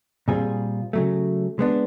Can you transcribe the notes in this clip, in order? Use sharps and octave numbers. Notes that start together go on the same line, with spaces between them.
A#2 G3 C4 F4 G#4
C#3 F#3 A3
G#3 B3 D4